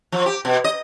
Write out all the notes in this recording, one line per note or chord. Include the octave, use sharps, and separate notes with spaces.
F3
G4
B2
D#5